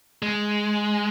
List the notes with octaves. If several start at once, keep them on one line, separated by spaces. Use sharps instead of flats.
G#3